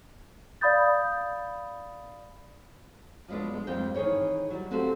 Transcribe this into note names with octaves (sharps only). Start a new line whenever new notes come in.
D5 F5 B5 D#6 G6 A6
F3 F#3 G#3 B3 D4
G#3
F2 G3 A#3 C4 G5
D#3 E3 G#4 C#5 G5
F#3 G3
C4 F#4 G4 A4 C5 F5